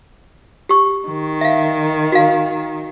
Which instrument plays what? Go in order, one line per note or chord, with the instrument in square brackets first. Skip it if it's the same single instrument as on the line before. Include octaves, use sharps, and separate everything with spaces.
[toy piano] G4 C#6
[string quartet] D#3
[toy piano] E5 F5
F#4 F5